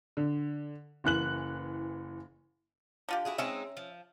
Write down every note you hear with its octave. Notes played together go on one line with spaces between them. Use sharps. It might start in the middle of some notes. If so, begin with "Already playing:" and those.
D3
F#1 E3 F#6 F#7
D3 F4 G4
E4 F#4 G#4
G#3 C4 C#4 D#4 E5
F3